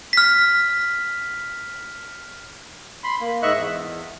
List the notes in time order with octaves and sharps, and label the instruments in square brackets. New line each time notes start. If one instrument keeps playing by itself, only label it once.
[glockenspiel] F6 B6
[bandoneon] B5 C6
A#3
G#2 D#5 E5 C#6 F#6
E2